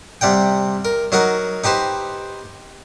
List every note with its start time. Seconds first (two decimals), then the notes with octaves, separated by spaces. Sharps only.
0.21 C3 G3 F#5 G5
0.85 A#4
1.12 F#3 D#4 A#4 F#5
1.64 D#4 G4 B4 C5